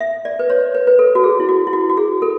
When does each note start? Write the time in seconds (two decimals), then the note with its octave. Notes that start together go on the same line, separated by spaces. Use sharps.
0.01 E5
0.25 D5
0.39 B4
0.50 C#5
0.75 B4
0.87 B4
0.99 A4
1.15 F#4
1.24 G#4
1.40 E4
1.49 F#4
1.67 E4
1.73 F#4
1.90 F#4
1.97 G#4
2.22 A4